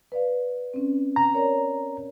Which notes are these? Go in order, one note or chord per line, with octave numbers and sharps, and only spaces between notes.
B4 D5 F5
C4 C#4
A#5
A#4 C#5 D5